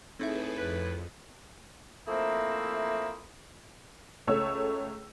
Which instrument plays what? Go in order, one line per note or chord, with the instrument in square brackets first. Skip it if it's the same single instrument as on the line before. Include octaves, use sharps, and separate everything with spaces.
[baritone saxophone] A2 [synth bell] C4 D#4 E5 [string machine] G#4 A4 B4
[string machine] F2 [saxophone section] B4
[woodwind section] F3 A3 A#3 C4 D#4 E4
[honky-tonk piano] C#2 A3 C#5 E6